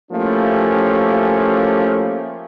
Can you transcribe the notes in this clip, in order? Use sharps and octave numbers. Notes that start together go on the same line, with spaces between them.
F3 A3 A#3 C#4 E4 G4